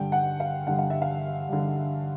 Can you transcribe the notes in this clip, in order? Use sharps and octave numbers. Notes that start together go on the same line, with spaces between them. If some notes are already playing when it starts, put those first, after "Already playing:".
Already playing: G2 D3 G5
F#5
F5
G2 D3 F#5
F5
E5
F5
G2 D3